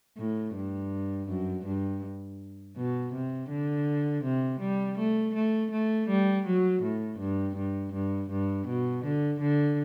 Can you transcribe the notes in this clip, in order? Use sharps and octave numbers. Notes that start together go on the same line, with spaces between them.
A2
G2
F#2
G2
B2
C3
D3
C3
G3
A3
A3
A3
G3
F#3
A2
G2
G2
G2
G2
B2
D3
D3